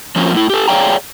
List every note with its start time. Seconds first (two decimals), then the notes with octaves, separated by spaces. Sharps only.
0.16 F3 F#3 A#3 C4 C#4 F4
0.33 A2 E4
0.50 G4 A4
0.68 G#4 C#5 D5 F5 G5 A#5